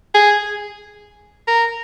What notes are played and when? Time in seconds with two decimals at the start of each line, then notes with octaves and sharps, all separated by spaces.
0.14 G#4
1.47 A#4